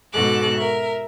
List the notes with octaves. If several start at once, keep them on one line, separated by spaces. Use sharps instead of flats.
G#2 B2 F#4 A4 D6 F#6
A#4 E5